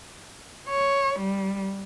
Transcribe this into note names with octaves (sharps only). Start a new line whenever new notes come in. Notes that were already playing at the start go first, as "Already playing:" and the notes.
C#5
G3